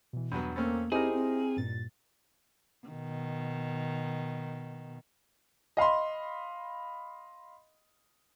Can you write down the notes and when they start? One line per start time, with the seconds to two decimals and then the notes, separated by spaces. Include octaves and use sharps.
0.13 B2 E3
0.32 E2 G2 F#3 B3
0.56 A3 A#3 C4 C#4
0.92 C4 D#4 E4 G4 G#4 A#4 C5
1.13 C4
1.57 G2 A#2 A6
2.88 B2 D#3
5.77 D#5 F5 B5 C6